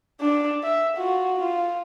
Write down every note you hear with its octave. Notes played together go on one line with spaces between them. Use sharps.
D4
E5
F4 F#4
F4